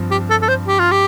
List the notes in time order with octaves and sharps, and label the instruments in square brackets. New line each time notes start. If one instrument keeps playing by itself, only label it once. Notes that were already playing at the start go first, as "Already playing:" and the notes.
Already playing: [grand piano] G2 F3 C4
[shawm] G4
A4
A4
C5
G4
F4
G4